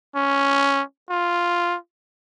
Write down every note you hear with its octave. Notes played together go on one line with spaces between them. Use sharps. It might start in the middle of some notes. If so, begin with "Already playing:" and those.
C#4
F4